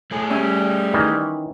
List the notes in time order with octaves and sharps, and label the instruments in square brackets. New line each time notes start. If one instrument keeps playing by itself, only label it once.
[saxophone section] A2 [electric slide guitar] A3 G#4 G#5
[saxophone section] G3 [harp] C#4 E5
[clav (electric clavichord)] D#3 E3